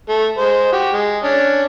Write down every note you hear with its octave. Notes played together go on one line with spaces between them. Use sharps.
A3
G#3 C5
F#4 G4
G#3
C#4 D4